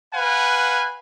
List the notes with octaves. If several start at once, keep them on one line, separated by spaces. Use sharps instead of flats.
B4 F5 F#5 G#5